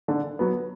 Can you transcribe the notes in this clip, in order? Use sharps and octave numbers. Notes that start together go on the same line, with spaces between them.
D3
F#3 B3